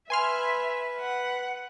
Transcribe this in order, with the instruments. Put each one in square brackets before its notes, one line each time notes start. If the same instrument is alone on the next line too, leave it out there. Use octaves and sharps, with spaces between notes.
[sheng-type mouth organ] B4 [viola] E5 [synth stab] G#5 C6 F6
[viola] F#5